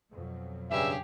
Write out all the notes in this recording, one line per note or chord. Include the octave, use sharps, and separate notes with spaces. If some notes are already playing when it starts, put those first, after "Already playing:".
F2 B2 F#3
G2 C#3 G4 G#4 E5